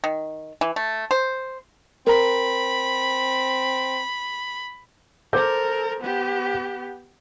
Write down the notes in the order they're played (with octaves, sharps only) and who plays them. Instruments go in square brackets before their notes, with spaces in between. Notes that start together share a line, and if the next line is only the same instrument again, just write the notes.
[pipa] D#3
E3
A3
C5
[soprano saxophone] C4 [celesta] A#4 A#5 [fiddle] B5
[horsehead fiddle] A4 A#4 [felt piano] C5 D6 G6
[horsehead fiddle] B3 G4